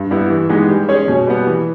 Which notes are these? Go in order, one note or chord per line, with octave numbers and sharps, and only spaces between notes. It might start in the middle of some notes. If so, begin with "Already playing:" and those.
Already playing: G2
G3 B3 E4
E3
G#3 B3 D#4 G4
G3
C#4 G#4 C#5
B2
G3 B3
E3